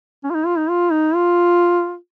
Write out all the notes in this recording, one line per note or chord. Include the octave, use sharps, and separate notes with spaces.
C#4
F4
D#4
F4
D#4
F4
D#4
F4